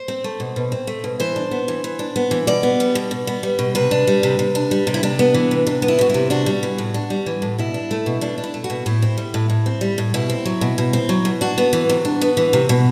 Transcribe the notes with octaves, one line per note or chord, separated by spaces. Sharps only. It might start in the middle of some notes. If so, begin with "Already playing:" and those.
Already playing: C5
C4
A3
B2
B2
C4
A3
B2
E3 C5
D4
B3
E3
E3
D4
B3
E3
B2 D5
B3
G3
B2
B2
B3
G3
B2
C3 B4
D4
G3
C3
C3
D4
G3
C3
E4
C3 D4
B3
E3
C3
C3 D4
B3
E4
E3 F#4
C3 E4
D4 F#4
G3
E3
A2
D4
G3
E3
A2
B2 E4
D4
A3
B2
B2 D4
D4
E4
A3
F#4
B2
A2 E4
C4
G3
A2
A2
C4
G3
A2
B2 E4
C4
F#3
B2
B2
C4
F#3
B2
D4 F#4
B3
E3
C3
D4
B3
E3
C3
B2